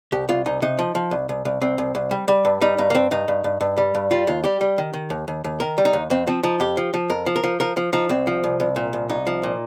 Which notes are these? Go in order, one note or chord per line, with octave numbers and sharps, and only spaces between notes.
C2 G4
C2 F4
C2 D#4
C3 D#4
F3
F3
C2
C2
C2
C2 C4
C2
C2
G3
G3
G2
G3 D#4
G2 D#4
A#3
G2 C4
G2 D#4
G2
G2
G2
G3
G2
G3 F4
D#2 F4
G3 G4
G3
D#3
D#3
D#2
D#2
D#2
D#3 A#4
G3
D#4
D#2
F2 C4
F3 C4
F3 D#4
F2 G4
F3
F3
F2 A#4
F3
A#4
F3
F3 A#4
F3
F3 D#4
C2 C4
F3
C2
C2
A#2
C2
C2 D#4
F3
A#2